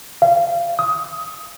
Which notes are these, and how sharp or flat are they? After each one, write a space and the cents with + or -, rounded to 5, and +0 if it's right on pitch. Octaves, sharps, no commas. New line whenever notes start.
F5 -25
D#6 +20